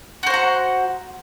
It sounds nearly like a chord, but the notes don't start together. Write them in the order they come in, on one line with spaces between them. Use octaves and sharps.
F#4 C5 F#5 A#5